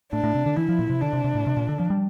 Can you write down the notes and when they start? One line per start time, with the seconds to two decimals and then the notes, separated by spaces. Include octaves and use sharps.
0.13 A2 D4
0.24 A2
0.35 C3
0.46 D3
0.57 E3 E4
0.69 F3
0.79 A#2
0.90 C3
1.01 D3 D4
1.13 C3
1.24 C3
1.35 A2
1.47 C3
1.57 A#2
1.69 D3
1.80 F3
1.90 G3